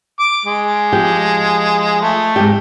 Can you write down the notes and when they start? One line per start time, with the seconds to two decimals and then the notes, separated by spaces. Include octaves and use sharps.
0.19 D6
0.45 G#3
0.93 F3 G4
2.01 A3
2.36 G#2 G4